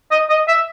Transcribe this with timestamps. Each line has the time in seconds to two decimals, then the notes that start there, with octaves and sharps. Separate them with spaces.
0.11 D#5
0.30 D#5
0.48 E5